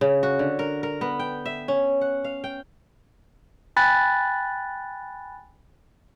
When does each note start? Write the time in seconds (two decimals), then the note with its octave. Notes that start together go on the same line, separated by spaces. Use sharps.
0.01 C#3
0.23 F#4
0.39 D3
0.59 A#4
0.83 A#4
1.01 B3
1.19 G5
1.46 E5
1.68 C#4
2.01 F#5
2.24 F5
2.44 G5
3.76 G5 G#5 B5 F#6 A6